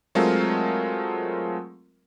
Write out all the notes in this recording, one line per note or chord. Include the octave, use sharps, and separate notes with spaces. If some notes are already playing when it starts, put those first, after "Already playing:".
F#3 G#3 A3 C4 F4 A#4